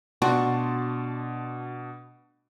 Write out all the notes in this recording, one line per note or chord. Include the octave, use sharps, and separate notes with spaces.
B2 D4 F#4 D5 A5 C6